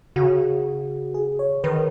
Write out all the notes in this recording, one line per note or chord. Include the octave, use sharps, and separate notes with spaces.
C#3 F#4
G#4
C#5
D#3 B4